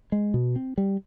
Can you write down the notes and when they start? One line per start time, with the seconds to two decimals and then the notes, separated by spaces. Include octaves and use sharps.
0.12 G#3
0.34 B2
0.56 C4
0.78 G3